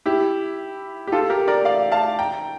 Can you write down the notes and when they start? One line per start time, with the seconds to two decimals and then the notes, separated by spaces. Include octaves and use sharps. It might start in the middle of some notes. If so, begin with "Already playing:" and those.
0.06 E4 G4
1.07 G4
1.12 F4 A4
1.30 G4 A#4
1.48 A#4 D5
1.65 D5 F5
1.92 F5 A5
2.19 G5 A#5